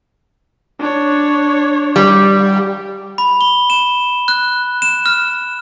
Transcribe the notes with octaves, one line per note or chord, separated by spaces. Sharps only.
D4 C#5
G3
B5
G7
E7
F#6
E7
F6